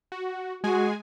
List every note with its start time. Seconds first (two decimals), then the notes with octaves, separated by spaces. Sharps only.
0.12 F#4
0.64 G#3 F#4 G#4 G#5